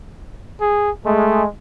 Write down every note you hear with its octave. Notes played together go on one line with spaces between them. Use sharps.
G#4
G#3 A3